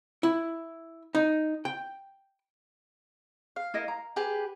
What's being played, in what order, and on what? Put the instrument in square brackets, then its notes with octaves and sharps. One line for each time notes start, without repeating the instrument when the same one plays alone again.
[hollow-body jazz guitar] E4
D#4
G5
[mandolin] F5
[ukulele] E4 A#4 D#5
A#5
[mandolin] G4 G#4 B4